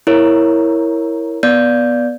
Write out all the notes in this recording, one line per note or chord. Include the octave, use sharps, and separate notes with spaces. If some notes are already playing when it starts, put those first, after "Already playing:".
E4 A#4 C#5
B3 D5 G6